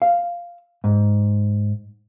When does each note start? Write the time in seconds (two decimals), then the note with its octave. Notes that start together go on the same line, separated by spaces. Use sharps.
0.02 F5
0.84 G#2